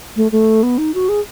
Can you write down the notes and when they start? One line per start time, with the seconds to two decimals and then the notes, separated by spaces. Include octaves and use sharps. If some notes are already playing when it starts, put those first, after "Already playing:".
0.16 A3
0.32 A3
0.63 B3
0.78 D#4
0.94 F#4
1.09 G#4